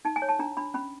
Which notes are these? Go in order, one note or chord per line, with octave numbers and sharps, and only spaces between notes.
D#4 A5
G#5
C#5
A5
D4 A#5
D4 B5
C#4 B5